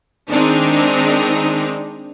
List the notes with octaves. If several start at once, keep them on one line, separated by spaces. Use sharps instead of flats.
D#3 G#3 C4 D4 D#4